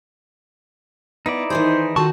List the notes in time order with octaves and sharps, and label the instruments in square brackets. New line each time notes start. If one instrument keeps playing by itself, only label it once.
[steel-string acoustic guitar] B3 [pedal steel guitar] D#4 E4 D5
[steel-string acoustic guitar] D#3 E3 G#4 [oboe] C5
[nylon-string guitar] D#3 F#4 A5 [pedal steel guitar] F4 A4 C#6